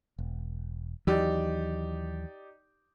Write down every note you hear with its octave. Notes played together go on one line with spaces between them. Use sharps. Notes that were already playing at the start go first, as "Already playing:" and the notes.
E1
D#2 E3 F#3 D#4 G4 D5